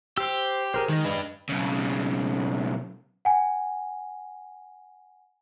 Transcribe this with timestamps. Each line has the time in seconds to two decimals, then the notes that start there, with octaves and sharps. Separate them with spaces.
0.18 G4 C5 E6
0.74 G#4 A#4 C5
0.89 D#3 G#3 D#5
1.05 D4 B4
1.49 B1 C#3
3.25 F#5 G#5